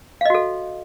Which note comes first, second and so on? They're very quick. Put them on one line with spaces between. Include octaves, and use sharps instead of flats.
F5 D#5 F#4 A4